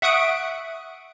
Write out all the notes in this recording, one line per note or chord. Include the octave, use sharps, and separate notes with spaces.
E5 F#5 C#6 D#6 F#6 D7